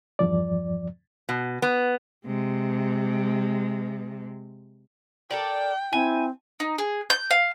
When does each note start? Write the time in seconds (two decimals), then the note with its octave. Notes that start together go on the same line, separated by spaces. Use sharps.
0.19 E2 G2 F3 D5
1.29 B2
1.62 B3
2.25 C3 G#3
5.31 A4 A#4 D5 G5
5.93 C4 E4 G#5
6.60 D#4
6.78 G#4
7.10 G6
7.31 F5